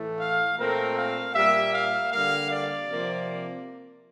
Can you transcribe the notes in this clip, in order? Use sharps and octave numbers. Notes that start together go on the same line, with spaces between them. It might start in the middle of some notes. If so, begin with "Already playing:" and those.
Already playing: A2 E3 A3
F5
A#2 A3 C4 A#4
F5
A#2 G3 A#3 E5
F5
D3 G3 A#3 F5
D5
C3 F3 A#3